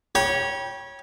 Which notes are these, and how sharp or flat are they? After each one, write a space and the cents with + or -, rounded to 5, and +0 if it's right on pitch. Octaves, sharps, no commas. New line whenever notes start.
C#5 -5 G5 +0 B5 -40